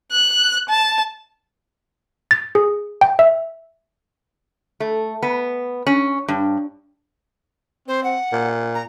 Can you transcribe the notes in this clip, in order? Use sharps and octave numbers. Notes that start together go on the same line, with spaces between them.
F#6
A5
A6
G#4
G5
E5
A3
B3
C#4
G2
C4 C5
F#5
A#2
A#5